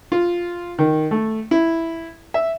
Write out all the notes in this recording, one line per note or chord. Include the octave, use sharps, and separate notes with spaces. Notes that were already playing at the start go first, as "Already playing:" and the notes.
F4
D#3
A3
E4
E5